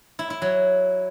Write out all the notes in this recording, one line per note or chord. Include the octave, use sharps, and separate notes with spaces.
E4
E4
F#3